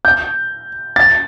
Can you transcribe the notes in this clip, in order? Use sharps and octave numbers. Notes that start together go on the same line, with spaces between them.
G6
A6